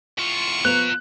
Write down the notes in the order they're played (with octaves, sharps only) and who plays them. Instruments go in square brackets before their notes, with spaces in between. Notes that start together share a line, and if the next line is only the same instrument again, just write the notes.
[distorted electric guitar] E2 F4 [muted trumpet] C#6
[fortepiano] F3 B3 [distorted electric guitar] F4 A#5 [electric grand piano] F#6